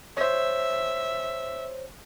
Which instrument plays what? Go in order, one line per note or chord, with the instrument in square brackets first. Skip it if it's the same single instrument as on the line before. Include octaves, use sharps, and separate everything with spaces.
[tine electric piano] C5 C#5 [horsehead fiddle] E5